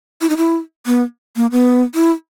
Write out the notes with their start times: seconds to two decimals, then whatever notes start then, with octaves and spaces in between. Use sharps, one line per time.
0.21 E4
0.29 D#4
0.37 E4
0.86 B3
1.36 A#3
1.52 B3
1.95 E4